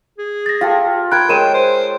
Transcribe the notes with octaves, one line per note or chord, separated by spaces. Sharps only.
G#4
A6 A#6
F4 G4 A4 F5
A#4 G5 B5 F#6 G#6
G#3 A#4 C#5 C6 D#7 E7
C5